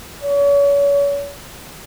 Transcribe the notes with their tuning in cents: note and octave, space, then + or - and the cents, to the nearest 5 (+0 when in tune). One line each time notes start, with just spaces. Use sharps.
C#5 +35